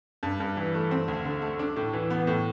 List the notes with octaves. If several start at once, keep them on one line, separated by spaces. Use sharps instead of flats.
G2
G2
E3
A3
C4
D2
D3
A3
D4
A2
E3
B3
A2